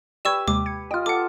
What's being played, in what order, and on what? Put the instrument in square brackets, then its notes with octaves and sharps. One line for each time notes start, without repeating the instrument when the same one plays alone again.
[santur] G4 B4 [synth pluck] D5 G#6 [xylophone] C#6 E6 E7
[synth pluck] D#2 C3 G#3 [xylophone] D6
[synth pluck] G#6 C#7
[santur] F4 D#5 [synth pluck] G5 F6
[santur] A4 [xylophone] F#5 D6